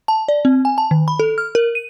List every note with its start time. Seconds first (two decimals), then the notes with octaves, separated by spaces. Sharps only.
0.08 A5
0.28 D5
0.45 C4
0.65 G#5
0.78 A5
0.91 D#3
1.08 B5
1.19 A4
1.38 F6
1.55 A#4
1.75 D#7